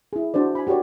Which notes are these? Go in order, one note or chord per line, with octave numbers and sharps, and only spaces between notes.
E4 G#4
D4 F#4 C5 D5
G#5 B5
F#4 G4 A#4 C#5 D5